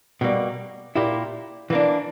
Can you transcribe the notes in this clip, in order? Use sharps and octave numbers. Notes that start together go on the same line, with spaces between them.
B2 G3 A#3
A#2 A#3 E4 G4
E3 A#3 D4